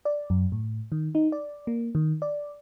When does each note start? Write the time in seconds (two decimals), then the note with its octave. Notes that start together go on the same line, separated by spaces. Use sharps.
0.05 D5
0.30 F#2
0.52 A2
0.92 D#3
1.15 D#4
1.32 D5
1.67 A#3
1.95 D#3
2.22 D5